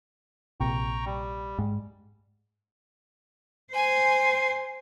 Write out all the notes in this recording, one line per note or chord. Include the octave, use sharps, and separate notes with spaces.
A#1 C3 G5 A#5 C#6
G3
G#2
C5 G#5